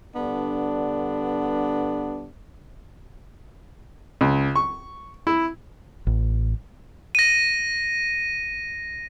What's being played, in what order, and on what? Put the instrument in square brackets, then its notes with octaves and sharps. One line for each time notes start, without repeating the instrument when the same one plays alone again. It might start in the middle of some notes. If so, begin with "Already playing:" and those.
[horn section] G2 D3 B3 D4
[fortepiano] C#2
C#6
E4
[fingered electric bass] A1
[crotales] A#6 D#7